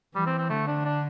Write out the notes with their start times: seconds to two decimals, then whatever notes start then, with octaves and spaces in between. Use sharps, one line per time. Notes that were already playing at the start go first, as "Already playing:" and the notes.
0.15 E3 G3
0.26 C4
0.38 C4
0.50 D3 A3
0.68 D4
0.85 D4